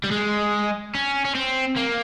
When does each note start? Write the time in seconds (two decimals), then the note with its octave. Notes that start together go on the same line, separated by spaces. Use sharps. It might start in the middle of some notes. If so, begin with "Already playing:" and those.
0.04 G3
0.11 G#3
0.95 C#4
1.25 C#4
1.35 C4
1.77 A#3